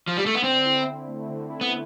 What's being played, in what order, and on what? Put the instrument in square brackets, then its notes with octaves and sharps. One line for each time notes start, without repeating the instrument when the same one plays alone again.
[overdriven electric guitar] F3
G3
A3
B3
[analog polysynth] D3 [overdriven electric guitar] C4
[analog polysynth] E4
C4
A3
D3
E4
[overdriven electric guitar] B3